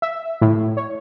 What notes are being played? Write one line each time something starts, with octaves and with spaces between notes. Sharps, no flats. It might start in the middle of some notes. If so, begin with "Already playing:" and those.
E5
A2
C#5